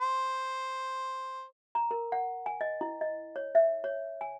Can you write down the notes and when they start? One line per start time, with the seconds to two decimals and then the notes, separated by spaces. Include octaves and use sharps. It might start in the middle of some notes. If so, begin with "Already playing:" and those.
0.01 C5
1.75 A#5
1.91 A#4
2.12 F#5
2.46 G#5
2.61 D#5
2.81 E4
3.01 D#5
3.36 C#5
3.55 E5
3.84 C#5
4.21 G#5